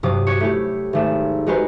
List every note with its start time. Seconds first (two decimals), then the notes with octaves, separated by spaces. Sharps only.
0.03 G2 C3 F#3 D6 D#6
0.27 F#4 C#5
0.40 A3 E4 G4
0.93 G#1 A3 E7
1.47 G#3 D#4 F#4 G4 B4 C5